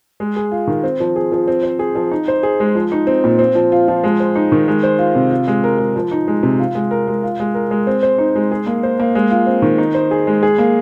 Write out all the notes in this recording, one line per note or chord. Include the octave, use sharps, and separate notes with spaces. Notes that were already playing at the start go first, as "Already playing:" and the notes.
G#3
G#4
F4
D#3
C4
F3
G#4
F3
C4
C5
G#4
F3
D#4
C5
G#4
G#3
F3
D#4
C4
A#2
C4
F3
F4
F3
G#3
C5
D#4
D#3
G#3
C5
F4
C3
F4
G#3
A#4
G#3
F3
D#4
G#3
C3
F4
G#3
A#4
G#3
F4
G#3
A#4
G#3
C4
C5
D#4
G#3
G#4
A#3
C5
A#3
G#3
F4
C4
D#3
D#4
C5
G#4
G#3
G#4
A#3